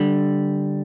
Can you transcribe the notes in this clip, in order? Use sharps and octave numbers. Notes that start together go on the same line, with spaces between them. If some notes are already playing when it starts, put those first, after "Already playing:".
Already playing: D3 G3